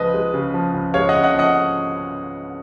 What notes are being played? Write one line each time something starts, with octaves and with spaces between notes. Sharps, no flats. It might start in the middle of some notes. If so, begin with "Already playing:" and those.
Already playing: C#2 F3 B4 D#5
G#3
C#3
F3
C#2
G#3 C#5 F5
C#3 D#5 F#5
D#5 F#5
F3
D#5 F#5